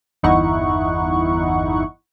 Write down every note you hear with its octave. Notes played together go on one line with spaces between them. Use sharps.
G1 E2 D#4 E4 F#5 C#6